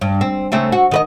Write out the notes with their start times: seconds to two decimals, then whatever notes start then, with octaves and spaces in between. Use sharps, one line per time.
0.01 G2
0.21 C4
0.52 C#3 A3 C4
0.72 F#4
0.91 D#3 B4 D#5